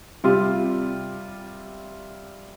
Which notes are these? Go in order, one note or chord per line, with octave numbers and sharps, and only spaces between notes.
C3 G3 F4